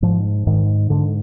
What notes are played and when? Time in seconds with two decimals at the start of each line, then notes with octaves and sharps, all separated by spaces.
0.02 G#2 F3
0.47 G#2 D#3
0.90 G#2 D3